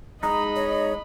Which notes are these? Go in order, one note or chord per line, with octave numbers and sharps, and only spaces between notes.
G#3 D#4 D#5 A#5 B5
C#5